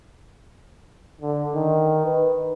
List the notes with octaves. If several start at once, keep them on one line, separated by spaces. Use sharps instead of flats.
D3
D#3
B4